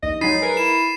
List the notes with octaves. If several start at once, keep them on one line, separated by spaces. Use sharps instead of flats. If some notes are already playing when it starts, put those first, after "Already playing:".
A#1 D#2 D#5
F#3 G#3 D#4 B5 A6 C7 D#7
G#4 A#4 B4
E4 E7